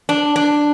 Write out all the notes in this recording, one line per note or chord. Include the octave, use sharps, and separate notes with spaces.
D4
D4